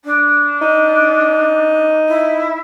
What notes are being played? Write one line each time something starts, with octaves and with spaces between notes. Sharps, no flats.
D4
D#4
E4